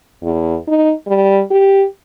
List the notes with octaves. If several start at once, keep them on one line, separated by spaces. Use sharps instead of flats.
E2
D#4
G3
G4